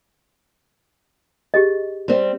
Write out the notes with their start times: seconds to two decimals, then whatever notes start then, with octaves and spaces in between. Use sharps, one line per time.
1.54 G4 G#4 D#5
2.08 G3 C4